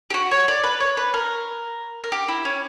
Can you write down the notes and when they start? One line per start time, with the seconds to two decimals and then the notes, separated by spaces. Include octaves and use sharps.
0.10 G4
0.14 F#4
0.31 C#5
0.48 D5
0.64 B4
0.80 C#5
0.97 B4
1.14 A#4
2.04 A#4
2.12 G4
2.28 E4
2.45 C#4